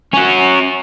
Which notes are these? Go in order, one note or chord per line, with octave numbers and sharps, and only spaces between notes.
C#4 F#4